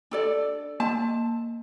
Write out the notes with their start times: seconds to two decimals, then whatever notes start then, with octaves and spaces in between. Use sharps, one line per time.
0.11 D4 A4 D5
0.80 A#3 A5